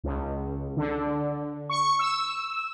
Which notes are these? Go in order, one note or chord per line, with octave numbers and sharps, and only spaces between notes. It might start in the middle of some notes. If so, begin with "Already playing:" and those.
C#2
D3
C#6
E6